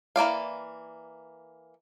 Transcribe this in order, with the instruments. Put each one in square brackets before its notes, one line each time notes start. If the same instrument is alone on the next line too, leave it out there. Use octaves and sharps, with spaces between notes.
[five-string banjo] E3 A#3 D5 F5